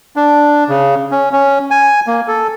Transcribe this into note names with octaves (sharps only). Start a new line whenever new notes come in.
D4
C#3
C#4
C#4
G#5
A#3
A4